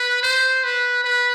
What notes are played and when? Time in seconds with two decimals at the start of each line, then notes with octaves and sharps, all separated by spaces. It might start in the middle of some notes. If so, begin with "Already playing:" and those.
Already playing: B4
0.23 C5
0.64 B4
1.04 B4